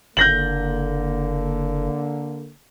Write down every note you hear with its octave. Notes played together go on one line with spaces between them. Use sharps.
F#1 D3 A#3 G6 A#6 F#7